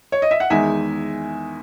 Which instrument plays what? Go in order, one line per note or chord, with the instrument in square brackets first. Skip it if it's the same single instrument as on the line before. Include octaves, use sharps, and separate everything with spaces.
[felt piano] C#5
D#5
E5
F#5
E2 D#3 G#3 D#4 E5 G#5